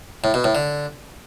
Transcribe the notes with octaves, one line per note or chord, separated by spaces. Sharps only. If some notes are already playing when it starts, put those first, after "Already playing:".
A2
B2
A2
D3